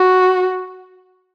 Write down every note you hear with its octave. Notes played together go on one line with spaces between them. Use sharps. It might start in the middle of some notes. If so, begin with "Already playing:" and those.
Already playing: F#4